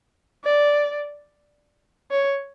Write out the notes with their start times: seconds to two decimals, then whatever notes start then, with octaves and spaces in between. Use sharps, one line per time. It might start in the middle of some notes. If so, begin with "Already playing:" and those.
0.44 D5
2.11 C#5